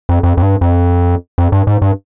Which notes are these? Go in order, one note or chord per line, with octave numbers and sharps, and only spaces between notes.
F2
F2
F2
G2
F2
F2
G2
G#2
G2